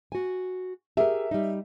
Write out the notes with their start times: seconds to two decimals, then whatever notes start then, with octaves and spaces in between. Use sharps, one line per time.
0.12 F#4 G#5
0.97 G4 G#4 A#4 E5
1.31 G3 D#4